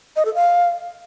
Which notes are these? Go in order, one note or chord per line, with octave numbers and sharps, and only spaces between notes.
D#5
A4
F5